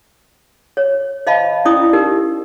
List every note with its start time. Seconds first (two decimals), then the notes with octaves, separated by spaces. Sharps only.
0.77 C#5
1.27 C5 D#5 F5 A5 B5
1.65 C#4 E4 D5 D#6
1.93 D#4 G4 A#4